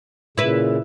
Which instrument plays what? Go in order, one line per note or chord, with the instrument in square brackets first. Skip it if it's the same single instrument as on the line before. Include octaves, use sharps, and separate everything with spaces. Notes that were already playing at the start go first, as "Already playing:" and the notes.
[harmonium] A#2 C#3 [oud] E4 B4